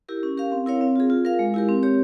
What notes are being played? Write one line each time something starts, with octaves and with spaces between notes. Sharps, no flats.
E4 G4 A#4
C#4
G4 A#4 F5
C4
E4 A#4 C#5 F5
C4
F4 G#4
F4
A#4 F5
G#3
E4 G4 A#4
C4
G4 C#5